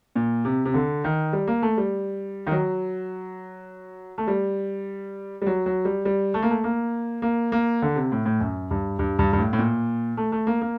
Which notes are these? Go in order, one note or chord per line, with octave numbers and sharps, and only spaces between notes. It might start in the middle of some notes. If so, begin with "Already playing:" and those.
A#2
C3
C3
D3
D#3
G3
A#3
A3
G3
D#3
F#3
A3
G3
G3
F#3
F#3
G3
G3
A3
A#3
A3
A#3
A#3
A#3
D3
C3
A2
A2
F#2
G2
G2
G2
G2
A2
A2
A#2
A3
A3
A#3
A#3